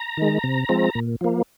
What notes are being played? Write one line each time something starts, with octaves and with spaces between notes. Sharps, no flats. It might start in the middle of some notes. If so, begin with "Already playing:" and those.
Already playing: A#5
D#3 G#3
C3
F3 G#3 C4
A#2
F3 A#3